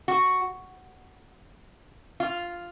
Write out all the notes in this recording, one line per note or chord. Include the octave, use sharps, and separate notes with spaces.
F#4
F4